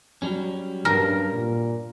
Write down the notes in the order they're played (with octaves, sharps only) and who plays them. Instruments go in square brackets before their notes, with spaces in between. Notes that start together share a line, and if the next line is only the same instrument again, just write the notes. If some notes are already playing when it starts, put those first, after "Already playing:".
[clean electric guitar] F#3 G3 C#4
[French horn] G2 [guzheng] A#4
[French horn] A#2